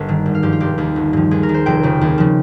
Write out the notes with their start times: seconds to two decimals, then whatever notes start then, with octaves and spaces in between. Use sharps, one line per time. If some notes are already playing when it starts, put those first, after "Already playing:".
Already playing: G1 A#4
0.08 G2 D#3
0.26 G#1
0.35 F5
0.43 G2 F3 G4
0.52 F4
0.60 F1 G4
0.78 D#2 D#3
0.96 G1
1.13 G2 F3
1.31 D#2 G#4
1.43 A#4
1.49 D#3
1.54 C5
1.66 F1 G5
1.83 F2 C#3
2.01 D#2
2.18 C#3 F3